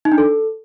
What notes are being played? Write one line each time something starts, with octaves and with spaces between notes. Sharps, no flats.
D#4
D4
A4